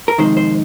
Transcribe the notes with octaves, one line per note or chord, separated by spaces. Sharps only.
A#4
F2 C3 D#3 G#3 C5
C5